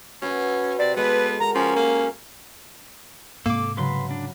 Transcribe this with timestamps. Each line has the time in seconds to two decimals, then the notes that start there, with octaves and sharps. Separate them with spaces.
0.22 C#4 F#4 B4
0.79 C3 D5
0.97 G#3 B3 A4 B4 C#5
1.40 A#4 F#5 A#5
1.55 F3 C#4
1.76 A#3
3.46 G#2 C3 A#3 A4 D6
3.77 C#3 F#3 B4 B5 C6
4.11 D4